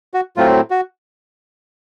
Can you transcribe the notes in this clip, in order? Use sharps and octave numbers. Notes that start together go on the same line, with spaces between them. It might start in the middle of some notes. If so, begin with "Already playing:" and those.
F#4
A2 F#3 A3 C4 F4
F#4